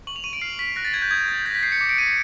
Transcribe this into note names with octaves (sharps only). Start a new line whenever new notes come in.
C#6 F#7
F7
C#6 D#7
D7
F6 C7
C#6 B6
F#6 A#6
A6
F#6 G#6
G6
D#6 G#6
D#6 A6
G6 A#6
B6
G6 C7
C#7
D6
D7
G6 D#7
C#7